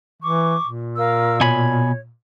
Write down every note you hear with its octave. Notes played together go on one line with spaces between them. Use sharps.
E3 C#6 D6
A#2
A#4 F5 E6
B2 C#5 G#5 B5